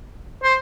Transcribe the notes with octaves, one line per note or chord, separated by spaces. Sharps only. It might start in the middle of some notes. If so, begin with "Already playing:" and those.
C5